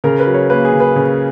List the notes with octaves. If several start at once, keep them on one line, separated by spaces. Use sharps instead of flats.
C#3 A#4
B4
F#3
C#5
A#3 B4
G#4
C#3
B4
C#3